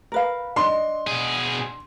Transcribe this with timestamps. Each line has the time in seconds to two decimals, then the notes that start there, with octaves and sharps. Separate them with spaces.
0.12 A#4 B4 F5
0.56 D4 D#5 C6
1.07 B2 G#4